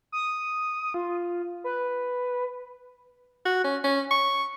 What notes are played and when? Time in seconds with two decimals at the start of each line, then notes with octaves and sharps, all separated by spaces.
0.12 D#6
0.94 F4
1.64 B4
3.46 F#4
3.64 C#4
3.84 C#4
4.11 C#6